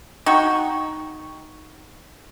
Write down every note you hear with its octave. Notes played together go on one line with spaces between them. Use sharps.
D#4 F#4 G5 C#6